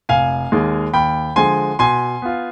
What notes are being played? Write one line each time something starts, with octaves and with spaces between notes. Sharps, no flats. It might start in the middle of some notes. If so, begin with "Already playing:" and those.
F1 F5 G#5
D#2 D#3 G#3
D#2 G5 B5
D3 F3 G#3 G#5 C6
B2 G#5 C6
B3 F4